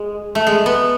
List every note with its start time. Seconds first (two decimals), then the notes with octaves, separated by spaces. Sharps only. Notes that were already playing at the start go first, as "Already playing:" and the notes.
Already playing: G#3
0.35 A3
0.47 G#3
0.66 B3